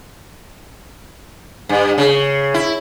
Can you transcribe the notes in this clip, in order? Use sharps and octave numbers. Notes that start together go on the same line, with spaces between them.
G2
C#3
E4